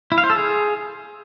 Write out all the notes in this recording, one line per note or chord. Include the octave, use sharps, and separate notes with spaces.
E4
F5
C5
A4
G#4